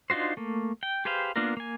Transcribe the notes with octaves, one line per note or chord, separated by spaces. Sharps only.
D4 D#4 F4 F#4 C5
A3 A#3
G5
G4 G#4 B4 C5 F5
A#3 B3 D4 F4 A#4
A#3 G#5